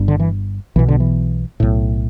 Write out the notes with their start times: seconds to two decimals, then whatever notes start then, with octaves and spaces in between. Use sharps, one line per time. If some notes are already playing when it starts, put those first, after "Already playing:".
Already playing: G1 G2
0.08 D3
0.20 E3
0.76 B1 B2 E3
0.88 D3
1.00 E3
1.60 B1 A2